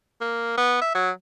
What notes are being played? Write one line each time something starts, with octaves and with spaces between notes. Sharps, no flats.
A#3
B3
E5
F#3